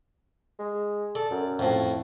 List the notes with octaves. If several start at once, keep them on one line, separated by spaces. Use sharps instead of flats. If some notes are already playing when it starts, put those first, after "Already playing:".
G#3
A4 D5
F#2
F2 A2